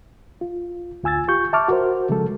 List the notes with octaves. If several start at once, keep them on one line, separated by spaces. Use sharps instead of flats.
F4
D2 F4 G#5 E6 G#6 A6
F4 G4 C#6 G6
E5 A5 C#6 D6 F6
F#4 A#4 C5
C#3 F3 G#3 A4